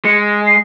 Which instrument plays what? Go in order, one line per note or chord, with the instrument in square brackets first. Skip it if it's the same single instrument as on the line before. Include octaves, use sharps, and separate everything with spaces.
[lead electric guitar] G#3 [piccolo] C#7
[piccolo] C7